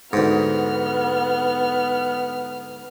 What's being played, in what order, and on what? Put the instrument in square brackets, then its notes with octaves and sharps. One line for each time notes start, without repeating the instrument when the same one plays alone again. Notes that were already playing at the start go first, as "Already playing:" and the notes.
[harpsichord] D2 G#2 [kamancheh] B3 F6